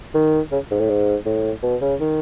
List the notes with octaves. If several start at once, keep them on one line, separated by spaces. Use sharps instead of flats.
D#3
C#3
G#2
A2
G#2
A2
B2
C#3
D#3